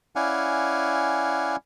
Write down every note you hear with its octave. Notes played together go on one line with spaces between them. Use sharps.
C#4 E4 D5 F5 F#5 G#5